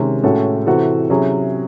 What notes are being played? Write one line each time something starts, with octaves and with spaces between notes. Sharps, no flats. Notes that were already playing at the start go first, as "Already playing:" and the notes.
Already playing: C3 D#3 G#3 C#4
A2 G#3 C#4 F#4 A4
C3 E3 C4 F#4 A4
C3 F#3 C#4 E4 G#4